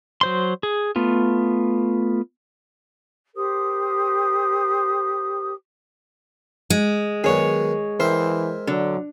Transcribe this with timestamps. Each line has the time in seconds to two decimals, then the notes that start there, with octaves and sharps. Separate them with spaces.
0.21 F#3 C5 C6
0.63 G#4
0.96 A3 B3 F4
3.35 G4 A#4 C5 D#6
6.70 G#3
7.24 D#3 F#3 B3 G#4 C#5
8.00 E3 A#4 C5 E5 G5
8.67 D3 F#3